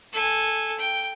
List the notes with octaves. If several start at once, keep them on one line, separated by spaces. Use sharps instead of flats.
A4 G#5
G5